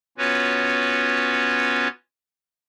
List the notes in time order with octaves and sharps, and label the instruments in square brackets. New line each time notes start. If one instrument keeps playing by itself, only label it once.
[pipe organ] B3 C#4 F4 F#4 B4 C#5